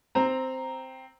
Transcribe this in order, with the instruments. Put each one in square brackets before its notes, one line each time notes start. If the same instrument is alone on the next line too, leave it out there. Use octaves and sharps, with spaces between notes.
[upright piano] C4 A#5